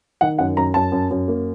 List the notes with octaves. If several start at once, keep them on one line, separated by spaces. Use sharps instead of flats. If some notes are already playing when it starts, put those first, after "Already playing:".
D#3 F#5
F#2 F#5
F#2 A#5
F#2 A5
F#2
F#2
A#3